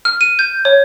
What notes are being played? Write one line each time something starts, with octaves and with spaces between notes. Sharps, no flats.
F6
D#7
G6
C#5